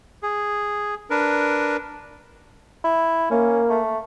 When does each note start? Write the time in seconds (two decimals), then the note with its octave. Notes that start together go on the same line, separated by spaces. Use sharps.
0.23 G#4
1.10 D4 A#4 B4
2.84 E4
3.31 A#3 C#4
3.69 A3